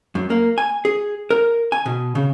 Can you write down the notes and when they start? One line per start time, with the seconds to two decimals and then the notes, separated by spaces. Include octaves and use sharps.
0.15 F#2
0.30 A#3
0.58 G#5
0.85 G#4
1.30 A#4
1.72 G#5
1.86 B2
2.15 C#3